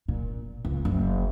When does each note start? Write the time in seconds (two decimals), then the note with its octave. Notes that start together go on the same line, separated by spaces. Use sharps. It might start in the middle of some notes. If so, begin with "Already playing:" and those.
0.08 A#2
0.65 C#2
0.85 F#1